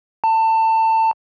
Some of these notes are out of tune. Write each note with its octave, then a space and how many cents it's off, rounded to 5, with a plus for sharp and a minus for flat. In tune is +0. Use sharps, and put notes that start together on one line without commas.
A5 +25